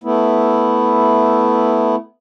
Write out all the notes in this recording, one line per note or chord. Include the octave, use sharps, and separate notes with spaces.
A3 B3 E4